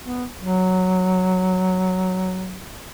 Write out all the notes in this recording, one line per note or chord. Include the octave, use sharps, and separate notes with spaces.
B3
F#3